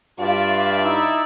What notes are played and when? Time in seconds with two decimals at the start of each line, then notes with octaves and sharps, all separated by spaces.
0.20 G2 F4 D5 E5
0.84 D#4 E4 E6